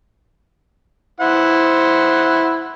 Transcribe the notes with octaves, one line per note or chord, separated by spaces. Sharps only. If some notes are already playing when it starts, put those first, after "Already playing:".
E4 C5 F#5